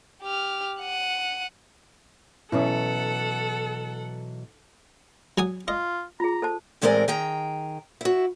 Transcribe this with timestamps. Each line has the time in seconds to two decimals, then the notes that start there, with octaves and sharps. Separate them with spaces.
0.23 G4 F6
0.81 F#5 D#7
2.52 B2 E3 F#3 C#4 E4 A4 F#5
5.38 F#3 G#5 D#6
5.68 F4 D#5
6.20 F4 G#4 A#5
6.42 A4 C5 A5
6.82 A2 E3 G#3 C4 A#4 D5
7.08 D#3 G#4 G5 A#5
8.01 E4 F#4